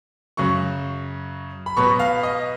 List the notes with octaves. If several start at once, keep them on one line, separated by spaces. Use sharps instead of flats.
F#2 C#3 F#3 C#6
B5
B2 F#3 B3 C#6
F5
D#5